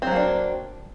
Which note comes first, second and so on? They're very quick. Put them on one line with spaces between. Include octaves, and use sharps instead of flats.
C4 F#3 A#3 D4